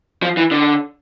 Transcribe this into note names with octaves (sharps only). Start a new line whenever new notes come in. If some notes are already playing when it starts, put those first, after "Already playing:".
F3
E3
D3